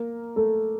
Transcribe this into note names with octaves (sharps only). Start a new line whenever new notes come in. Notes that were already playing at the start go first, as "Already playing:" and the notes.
Already playing: A#3 A#4
A3 A4